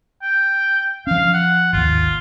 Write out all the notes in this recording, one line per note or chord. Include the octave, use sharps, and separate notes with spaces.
G5
F3 C#4 F5
F#5
G#1 D#2 F4